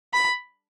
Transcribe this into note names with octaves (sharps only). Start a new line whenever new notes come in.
B5